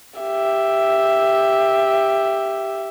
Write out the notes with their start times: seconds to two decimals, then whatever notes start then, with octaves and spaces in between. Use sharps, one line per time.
0.20 G4 E5